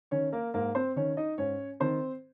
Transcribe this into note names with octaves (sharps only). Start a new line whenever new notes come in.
D#3 C#4 C#5
A#3 A#4
G#2 A#3 A#4
C4 C5
D#3 C#4 C#5
D#4 D#5
G#2 C#4 C#5
D#3 C4 C5